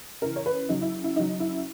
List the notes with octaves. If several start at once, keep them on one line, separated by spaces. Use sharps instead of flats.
C#3 E3 A#4
C#5
B4
C#3 F#3 D#4
E4
E4
C#3 F#3 D#4
E4